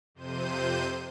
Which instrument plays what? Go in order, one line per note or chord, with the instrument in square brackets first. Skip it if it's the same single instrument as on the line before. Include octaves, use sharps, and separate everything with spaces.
[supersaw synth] F2 C3 C5 G6 D#7